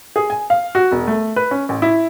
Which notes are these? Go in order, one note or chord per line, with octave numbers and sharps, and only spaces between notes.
G#4
G#5
F5
F#4
E1
A3
B4
C#4
A1
E4